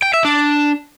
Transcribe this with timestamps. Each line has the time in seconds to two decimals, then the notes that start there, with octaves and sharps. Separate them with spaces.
0.02 G5
0.14 E5
0.25 D4